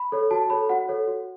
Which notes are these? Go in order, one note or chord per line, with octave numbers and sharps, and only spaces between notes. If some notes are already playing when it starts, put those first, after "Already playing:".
Already playing: B5
A4 C#5
F#4 A5
A4 C#5 B5
F#4 F#5
A4 C#5
F#4